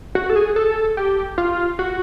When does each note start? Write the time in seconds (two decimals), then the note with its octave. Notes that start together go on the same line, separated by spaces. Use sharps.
0.15 F#4
0.30 A4
0.36 G#4
0.56 A4
0.97 G4
1.38 F4
1.79 F#4